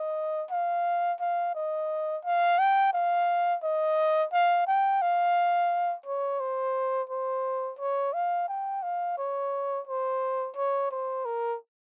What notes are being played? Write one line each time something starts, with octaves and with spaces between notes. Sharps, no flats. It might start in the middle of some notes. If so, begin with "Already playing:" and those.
Already playing: D#5
F5
F5
D#5
F5
G5
F5
D#5
F5
G5
F5
C#5
C5
C5
C#5
F5
G5
F5
C#5
C5
C#5
C5
A#4